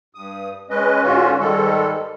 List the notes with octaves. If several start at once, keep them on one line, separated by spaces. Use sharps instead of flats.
G2 D#6
G#3 C#4 B4 D#5
G#2 D3 C#4 F4 F#4
G#2 D#3 G3 G#3 A4